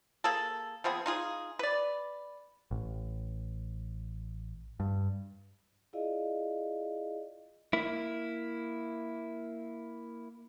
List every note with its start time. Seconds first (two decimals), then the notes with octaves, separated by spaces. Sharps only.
0.24 A#3 G#4 A4
0.84 F3 B3 C4 G#4
1.06 D#4 F4 G#4
1.59 B4 D5
2.71 A1
4.80 G2
5.93 E4 F4 G#4 D5 D#5 F5
7.73 A#3 E4